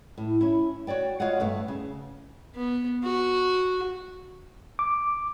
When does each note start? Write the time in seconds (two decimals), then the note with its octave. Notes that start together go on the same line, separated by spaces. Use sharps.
0.17 A2
0.41 C#4 E4
0.87 F#4 C#5 D5 G5
1.20 F4 F#4 C#5 D#5 F5 F#5
1.40 G2 A3 B3
1.68 C#3
2.56 B3
3.04 F#4
4.79 D6